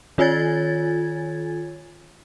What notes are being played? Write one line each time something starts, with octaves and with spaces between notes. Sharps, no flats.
D#3 F4 C#5 G#5 G#6 A6